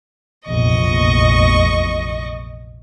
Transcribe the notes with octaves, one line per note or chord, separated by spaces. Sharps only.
F1 A#1 E2 D#5 C#6